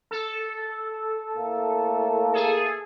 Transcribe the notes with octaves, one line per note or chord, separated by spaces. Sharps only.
A4
A2 A3 A#3
G#4 A4